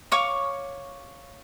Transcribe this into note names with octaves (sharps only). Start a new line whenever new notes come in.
C#5 F5 C#6 D6